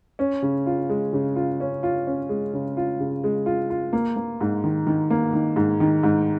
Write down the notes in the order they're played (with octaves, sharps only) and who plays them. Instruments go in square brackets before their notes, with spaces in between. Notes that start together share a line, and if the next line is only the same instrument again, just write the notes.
[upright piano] C#4
C#3
F4
G#3
C#3
F4
C#4
F4
C#4
G#3
C#3
F4
C#3
G#3
F4
F4
A#3
A#3
G#2
D#3
D#3
A#3
D#3
G#2
D#3
G#2